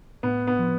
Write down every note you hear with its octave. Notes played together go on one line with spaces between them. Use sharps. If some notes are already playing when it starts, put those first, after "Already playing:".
A2 B3
B3
F3